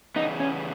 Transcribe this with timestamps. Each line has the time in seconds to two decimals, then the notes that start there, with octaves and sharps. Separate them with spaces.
0.16 E2 C#3 E3 G3 B3 D#4
0.40 C#4